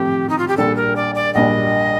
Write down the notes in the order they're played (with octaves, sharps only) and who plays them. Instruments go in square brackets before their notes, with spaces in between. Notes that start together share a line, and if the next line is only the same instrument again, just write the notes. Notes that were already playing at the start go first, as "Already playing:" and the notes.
Already playing: [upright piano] A2 F3 C4 [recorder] G4
[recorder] D#4
F4
G4
[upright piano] A#1 A#2 G3 D4 [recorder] A4
[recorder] A#4
D5
D5
[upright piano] A#1 A#2 G3 D4 [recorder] D#5